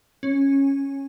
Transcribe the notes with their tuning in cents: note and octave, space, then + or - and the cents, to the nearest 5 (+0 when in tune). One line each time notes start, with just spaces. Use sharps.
C#4 -10